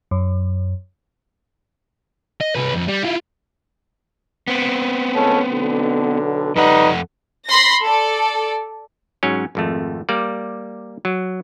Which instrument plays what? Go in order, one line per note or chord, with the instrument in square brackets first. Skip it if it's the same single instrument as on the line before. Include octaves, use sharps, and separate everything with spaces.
[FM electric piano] F#2
[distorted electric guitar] D#5
C2 B4
F2
G3
E4 F4
[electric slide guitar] B3 C4
[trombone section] C#2 C#4 A4
B1 D3
[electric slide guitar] F2 A4 F#5 [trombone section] G3 D#4 B4
[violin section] B5 C6 A#6
A4 D5
[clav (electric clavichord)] G#2 F#3 C#4
G#1 F2 A3
G3 A#3 D5
F#3